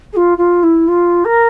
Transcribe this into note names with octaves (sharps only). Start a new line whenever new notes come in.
G#4
F4
F4
E4
F4
A#4